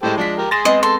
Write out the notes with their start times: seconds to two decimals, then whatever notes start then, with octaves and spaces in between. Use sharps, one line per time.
0.03 A2 G#3 G4 A4 C5
0.17 F3 G#3 D4 B6
0.38 G4 A#4
0.51 G#4 C6 A6 A#6 E7
0.65 G#3 B3 C4 D#5
0.83 A4 C6